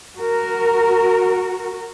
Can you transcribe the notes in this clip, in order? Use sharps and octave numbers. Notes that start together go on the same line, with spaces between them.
F#4 A#4